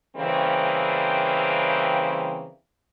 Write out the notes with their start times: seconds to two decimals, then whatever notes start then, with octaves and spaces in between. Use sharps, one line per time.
0.16 C#3 E3 G3 A#3 C4